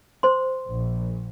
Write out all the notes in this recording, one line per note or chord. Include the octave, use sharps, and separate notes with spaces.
C5 C6
A#1